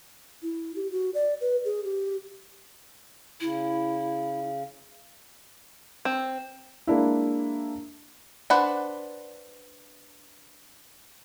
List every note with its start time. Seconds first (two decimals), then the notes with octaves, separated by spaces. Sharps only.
0.43 E4
0.76 G4
0.92 F#4
1.14 D5
1.41 B4
1.65 G#4
1.84 G4
3.40 C#3 E4
6.05 C4
6.87 G#3 A#3 D4 E4
8.50 D4 B4 C5 F#5